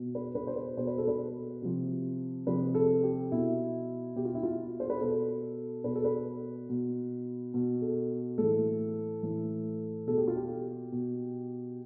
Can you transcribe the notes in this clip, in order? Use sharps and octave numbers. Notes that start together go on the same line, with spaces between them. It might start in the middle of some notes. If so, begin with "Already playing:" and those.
Already playing: B2
B4
B4
C5
B4
B2 C5
B4
A4
B4
C3 F3
C3 F3 B4
A4
G4
B2 E4
B2 G4
F4
E4
F4
C5
B4
B2 A4
B2 B4
A4
B4
B2
B2
A4
A2 E3 A4
A2 E3
B2 A4
G4
F4
G4
B2